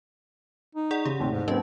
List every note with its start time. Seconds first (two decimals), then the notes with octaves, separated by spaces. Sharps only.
0.75 D#4
0.91 G#4 D5 F#5
1.05 C#3 G4
1.20 D#2 A2 C3 C4
1.32 G#2
1.48 F#3 A#3 C4 C#4 B4 D#5